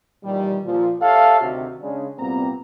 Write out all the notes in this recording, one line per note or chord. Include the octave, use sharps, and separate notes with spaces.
A#2 D#3 E3 G3
A#2 F3
G4 A4 C#5 E5 F5
D2 C3 D#3 F#4
C#3 G#3 D4
C2 A#2 G3 B3 C4 A#5